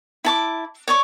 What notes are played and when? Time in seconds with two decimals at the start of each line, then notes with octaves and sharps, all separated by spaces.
0.25 E4 A5 D6
0.88 C#5 D5 C#6